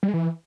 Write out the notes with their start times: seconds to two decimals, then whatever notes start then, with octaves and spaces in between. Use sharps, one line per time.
0.03 G3
0.08 G#3
0.14 E3